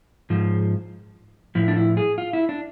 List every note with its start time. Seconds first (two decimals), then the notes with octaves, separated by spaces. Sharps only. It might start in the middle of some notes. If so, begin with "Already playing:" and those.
0.30 G#2 F3
1.55 A2 F3 E4
1.68 D4
1.76 E4
1.97 G#4
2.18 F4
2.33 E4
2.49 D4